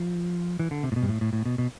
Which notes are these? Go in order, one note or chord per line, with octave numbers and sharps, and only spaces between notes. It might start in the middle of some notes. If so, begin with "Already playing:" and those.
Already playing: F3
E3
D3
C3
A2
B2
G2
A2
A2
A2
B2
B2